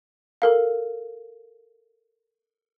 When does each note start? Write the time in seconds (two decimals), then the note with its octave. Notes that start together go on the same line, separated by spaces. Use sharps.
0.42 A4 A#4 F5